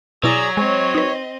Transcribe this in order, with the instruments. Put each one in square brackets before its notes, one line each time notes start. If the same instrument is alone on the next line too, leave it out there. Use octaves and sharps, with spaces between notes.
[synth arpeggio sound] B2 E4 A6 [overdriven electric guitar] F#3 [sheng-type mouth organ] G#4 D5 [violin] A#5
[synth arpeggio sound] G#3 [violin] C4 D#5 [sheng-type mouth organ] C#5
[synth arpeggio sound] D#4 B4